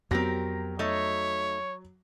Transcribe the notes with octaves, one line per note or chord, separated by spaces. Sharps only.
F2 F#3 B3 C4 G4 A#4 A#6
A3 D#4 C#5